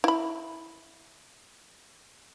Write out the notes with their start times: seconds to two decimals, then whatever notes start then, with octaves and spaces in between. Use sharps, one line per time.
0.04 E4 B5